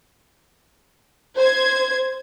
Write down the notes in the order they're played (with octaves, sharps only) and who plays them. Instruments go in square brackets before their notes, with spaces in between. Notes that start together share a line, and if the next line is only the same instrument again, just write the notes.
[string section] C5 G#6